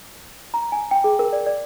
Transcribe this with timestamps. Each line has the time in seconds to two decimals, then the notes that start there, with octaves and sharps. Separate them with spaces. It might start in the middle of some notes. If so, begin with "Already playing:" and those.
0.54 A#5
0.72 G#5
0.91 G5
1.04 G#4
1.19 A#4
1.33 D5
1.46 D5